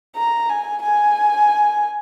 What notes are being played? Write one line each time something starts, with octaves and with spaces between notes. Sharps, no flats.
A#5
G#5
G#5